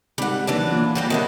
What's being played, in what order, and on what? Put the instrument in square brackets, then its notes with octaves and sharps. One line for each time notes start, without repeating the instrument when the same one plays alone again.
[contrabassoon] G#1 [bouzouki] G3 F#5
[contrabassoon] D#2 [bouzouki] E3 F#3 D4
[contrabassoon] A#2
[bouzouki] F#3 G3 G4
[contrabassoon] C3 [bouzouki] D#3 F#3 E4